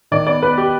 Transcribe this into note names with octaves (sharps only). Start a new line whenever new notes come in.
D#3 D5
B3 D5
B3 B4
G4